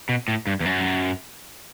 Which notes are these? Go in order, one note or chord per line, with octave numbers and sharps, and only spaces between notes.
B2
A2
G2
E2
F#2